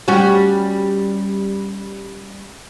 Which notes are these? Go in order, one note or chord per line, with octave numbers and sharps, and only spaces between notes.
G3 C#4 F#4